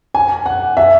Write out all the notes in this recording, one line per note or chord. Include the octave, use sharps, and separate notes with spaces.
G#5
F#5
E5